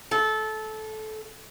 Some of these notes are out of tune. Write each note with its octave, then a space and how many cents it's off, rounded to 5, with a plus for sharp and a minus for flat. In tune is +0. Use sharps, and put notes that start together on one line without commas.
A4 -20